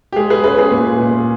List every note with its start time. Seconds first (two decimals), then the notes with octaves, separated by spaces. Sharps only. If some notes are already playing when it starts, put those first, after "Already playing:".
0.13 G4
0.16 G#3 G#4
0.30 G#4 B4
0.44 C#4 G#4 B4
0.58 G#4 B4
0.71 A#2
0.99 A#2